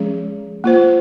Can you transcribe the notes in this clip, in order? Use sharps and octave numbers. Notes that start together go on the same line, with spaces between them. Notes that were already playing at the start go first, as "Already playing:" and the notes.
Already playing: F3 G#3 C#4 G#4
A#3 F4 C5